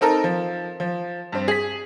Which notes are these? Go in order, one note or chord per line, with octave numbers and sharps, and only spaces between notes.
C4 D#4 A4 A#4
F3
F3
G2 C4
G#4 B6